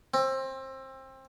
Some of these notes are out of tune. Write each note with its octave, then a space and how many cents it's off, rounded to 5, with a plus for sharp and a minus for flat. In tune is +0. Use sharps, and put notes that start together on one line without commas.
C4 +25